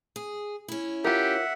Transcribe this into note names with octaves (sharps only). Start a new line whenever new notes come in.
G#4
C#4 E4
F4 G4 A#4 E5 F#5